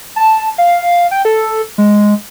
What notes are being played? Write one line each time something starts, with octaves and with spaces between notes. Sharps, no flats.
A5
F5
G5
A4
G#3